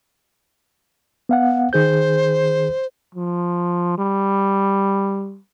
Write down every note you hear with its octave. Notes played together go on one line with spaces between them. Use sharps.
B3 F5 F#5
D#3 G#4 C5 G6
F3
G3